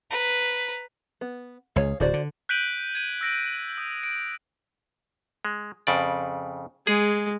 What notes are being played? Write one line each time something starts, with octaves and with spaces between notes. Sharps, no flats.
B4 A#5
B3
C#2 G#4 C#5 F5
D1 D3 F#4 C5 D5
D3
F#6 G6 B6 D7 D#7 F#7
G#6 D#7
E6 A#6 D7
D#6
D7
G#3
F2 C#3 D5
G#3 G#4